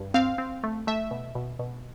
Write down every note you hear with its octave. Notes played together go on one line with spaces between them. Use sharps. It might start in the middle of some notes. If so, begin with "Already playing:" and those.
Already playing: G2
C4 F5
C4
A3
A3 E5
B2
B2
B2